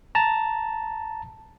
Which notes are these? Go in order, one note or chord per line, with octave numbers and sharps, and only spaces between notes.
A5 A#5